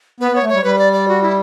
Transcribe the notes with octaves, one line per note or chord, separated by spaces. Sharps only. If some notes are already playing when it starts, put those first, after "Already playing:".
B3 B4
B3
C#5
A3
G3 C#5
G3 B4
D5
D5
F#4
E4